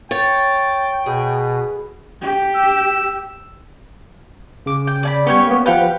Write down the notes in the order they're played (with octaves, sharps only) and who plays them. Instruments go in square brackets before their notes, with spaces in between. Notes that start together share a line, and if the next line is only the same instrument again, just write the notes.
[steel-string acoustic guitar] C#5 [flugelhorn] G5 [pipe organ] A6
[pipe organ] B2 [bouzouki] G#4
[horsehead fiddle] G4
[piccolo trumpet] E6
[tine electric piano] C#3 D6
[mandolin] G5
D5 G#5 B5
[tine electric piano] G3 B3 [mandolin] C#4 G4 C#5
[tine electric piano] A#3 B3
[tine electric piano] F3 B4 [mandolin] G4 F5 F#5